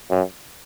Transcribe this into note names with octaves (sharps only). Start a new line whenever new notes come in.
F#2